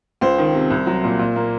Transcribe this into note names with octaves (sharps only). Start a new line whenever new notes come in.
C#2 C5
D#3
C3
C2
F#3
A#2
A#2
A#3